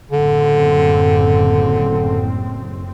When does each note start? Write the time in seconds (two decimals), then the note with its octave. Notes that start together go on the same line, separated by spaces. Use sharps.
0.11 F#1 A2 D3 C4